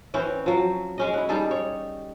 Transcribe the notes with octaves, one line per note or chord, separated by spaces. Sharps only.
E3 C4 C#4 C#5
F3 F#3
G#3 C#4 D#5
E4 F#5
G3 D#4 G#4 A4
C#5